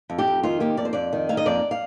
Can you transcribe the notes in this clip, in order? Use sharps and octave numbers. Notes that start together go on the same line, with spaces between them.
F2
G4
F2
D#3 F4
A#3 G4
F2 D5
C5
F2 D5
D#3
A#3 F5
D#5
F2 D5
F5